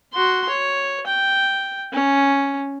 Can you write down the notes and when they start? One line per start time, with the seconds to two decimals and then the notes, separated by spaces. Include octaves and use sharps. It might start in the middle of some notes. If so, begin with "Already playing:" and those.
0.13 F#4 C6
0.49 C#5
1.07 G5
1.93 C#4